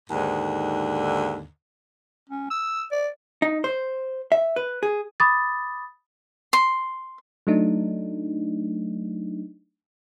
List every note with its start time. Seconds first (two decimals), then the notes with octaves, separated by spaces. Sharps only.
0.10 D#2 G#2 D3
2.29 C#4
2.50 E6
2.92 D5
3.42 D#4
3.64 C5
4.32 E5
4.56 B4
4.83 G#4
5.20 B5 D6 D#6 A6
6.53 C6
7.47 F#3 A3 D4 D#4